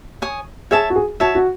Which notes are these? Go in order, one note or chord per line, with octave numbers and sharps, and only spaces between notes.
C#5 G#5 D#6
G#4 C#5 E5 A5
F#4
G#4
F#4 C#5 E5 A5
F#4